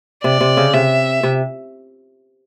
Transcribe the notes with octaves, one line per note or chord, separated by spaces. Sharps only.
C3 D5
C3
C#3
C3 E5
C3